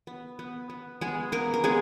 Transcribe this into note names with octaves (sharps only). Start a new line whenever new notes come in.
B3
B3
B3
G#3 B3 G#4
A#3 B3 A#4
A#4
G#3 B3 G#4